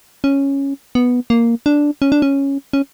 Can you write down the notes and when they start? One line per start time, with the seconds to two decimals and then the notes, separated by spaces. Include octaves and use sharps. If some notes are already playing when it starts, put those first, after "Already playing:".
0.24 C#4
0.95 B3
1.30 A#3
1.66 D4
2.02 C#4
2.12 D4
2.22 C#4
2.73 C#4